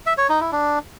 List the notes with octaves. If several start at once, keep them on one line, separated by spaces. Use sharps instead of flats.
E5
C#5
D#4
E4
D4